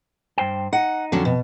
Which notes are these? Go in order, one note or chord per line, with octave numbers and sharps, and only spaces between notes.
G2 C5 G5
D#4 F#5
F2 D3 F#3 C#4
B2